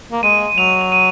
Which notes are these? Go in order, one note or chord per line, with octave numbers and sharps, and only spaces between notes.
A#3
G#3 D#7
F#3 F7
F7
D#7